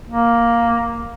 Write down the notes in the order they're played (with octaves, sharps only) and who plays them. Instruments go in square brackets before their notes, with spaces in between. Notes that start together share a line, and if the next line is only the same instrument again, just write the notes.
[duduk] A#3